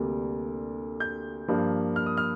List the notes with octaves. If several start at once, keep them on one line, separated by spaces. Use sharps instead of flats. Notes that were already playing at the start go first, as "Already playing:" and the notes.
Already playing: D2 C3 G3 A#3
G6
G2 F3 A#3
F6
D#6
F6